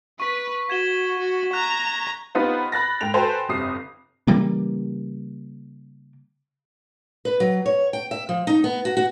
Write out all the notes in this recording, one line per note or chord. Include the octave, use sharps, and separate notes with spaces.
B4 C#6 B6
F#4 G#6 E7 G7
F#4
A#5 F#6
B3 D#4 F4 G4 B4 C5
B5 F#6 A6 A#6
G#2 G5 F7
F#4 A4 B4 C5 G5 G#5
G1 F2 C3 D#6 C7
C#3 E3 G3 A#3
B4
F#3
C#5
G5
E5
F3
D#4
B3
F#4
F#4